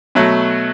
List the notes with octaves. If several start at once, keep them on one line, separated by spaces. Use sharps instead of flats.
B2 F#3 A3